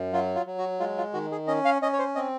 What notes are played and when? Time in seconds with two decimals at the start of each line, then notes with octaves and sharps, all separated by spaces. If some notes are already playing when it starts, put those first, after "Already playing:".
Already playing: F#2
0.13 F#3 F4
0.35 F4
0.46 F#3
0.58 F#4
0.80 G#3 F4
0.98 F4
1.14 D#3 F#4
1.32 G#4
1.47 C#4 D#5
1.65 F5
1.82 C#4 D#5
1.93 C#5
1.99 C5
2.15 C4 D#5